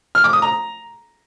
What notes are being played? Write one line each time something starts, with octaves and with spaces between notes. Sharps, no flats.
F6
D6
D#6
A#5